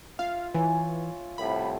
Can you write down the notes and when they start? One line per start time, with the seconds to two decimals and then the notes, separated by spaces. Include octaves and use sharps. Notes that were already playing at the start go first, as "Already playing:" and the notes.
0.19 F4 E5 F5
0.55 E3 C#5 G#5
1.38 C2 A2 B5